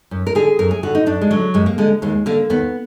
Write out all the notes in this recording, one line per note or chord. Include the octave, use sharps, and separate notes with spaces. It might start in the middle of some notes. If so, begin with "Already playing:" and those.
F#2
A#4
D3 G#4
F#2 A#4
G#4
D3 F#4
D#4
F#2 D4
G#3
D3 F#3
F#2 G#3
A#3
D3 G#3
D#2 G#3
D3 A#3
D#2 B3